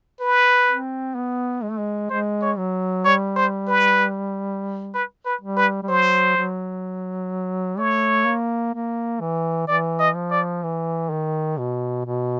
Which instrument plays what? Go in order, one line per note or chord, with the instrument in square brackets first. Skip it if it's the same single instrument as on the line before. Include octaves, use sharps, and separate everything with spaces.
[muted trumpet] B4
[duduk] C4
B3
G#3
A3
G#3
[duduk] G#3 [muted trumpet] C5
[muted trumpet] C#5
[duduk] F#3
[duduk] G3 [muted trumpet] C#5
[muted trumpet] C5
B4
B4
B4
[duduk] G3
[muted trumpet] B4
[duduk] G3
[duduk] F#3 [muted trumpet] C5
[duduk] F#3
[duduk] A3 [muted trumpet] C#5
[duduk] A#3
A#3
E3
[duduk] E3 [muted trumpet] D5
[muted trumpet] D#5
[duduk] F3
[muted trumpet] D5
[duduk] E3
D#3
B2
B2